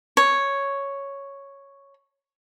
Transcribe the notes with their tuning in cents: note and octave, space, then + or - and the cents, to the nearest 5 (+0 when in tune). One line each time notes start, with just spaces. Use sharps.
C#5 +0